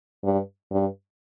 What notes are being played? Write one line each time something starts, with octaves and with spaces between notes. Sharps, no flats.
G2
G2